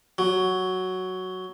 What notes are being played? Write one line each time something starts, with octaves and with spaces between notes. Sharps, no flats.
F#3